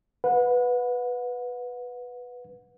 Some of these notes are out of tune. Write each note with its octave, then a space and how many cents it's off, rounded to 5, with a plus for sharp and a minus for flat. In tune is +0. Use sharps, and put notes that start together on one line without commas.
B4 +0 F#5 -35